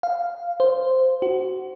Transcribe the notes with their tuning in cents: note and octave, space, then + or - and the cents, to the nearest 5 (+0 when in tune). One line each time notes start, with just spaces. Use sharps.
F5 -5
C5 -5
F#4 +20